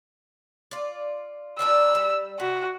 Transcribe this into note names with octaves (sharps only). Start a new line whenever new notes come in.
F4 D5
D4 A#4 D5 E6
G3
C3 F#4